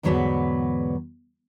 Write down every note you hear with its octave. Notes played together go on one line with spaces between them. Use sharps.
E2 G#2 D3 F#3 B3 B4